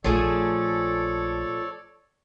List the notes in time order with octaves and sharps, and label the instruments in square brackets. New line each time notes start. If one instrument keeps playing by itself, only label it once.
[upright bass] A#1 [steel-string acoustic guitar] F3 A3 G#4 [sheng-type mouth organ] A4 C#5 D5